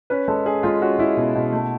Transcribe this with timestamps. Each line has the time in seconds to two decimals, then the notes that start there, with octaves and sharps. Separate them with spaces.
0.10 C#4 B4
0.28 G#3 A4
0.45 C#4 G#4
0.63 G#3 F4
0.81 C#4 F#4
0.99 G#3 E4
1.17 B2
1.35 B2
1.53 A3